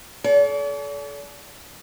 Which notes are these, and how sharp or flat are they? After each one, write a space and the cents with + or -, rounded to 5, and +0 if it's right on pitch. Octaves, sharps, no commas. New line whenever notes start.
A4 -40 D5 -45